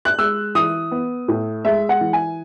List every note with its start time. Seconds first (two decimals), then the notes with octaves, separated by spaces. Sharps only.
0.05 F#6
0.19 G#3 E6
0.55 E3 D#6
0.92 B3
1.28 A2
1.65 G#3 E5
1.89 F#5
2.01 E3
2.13 G#5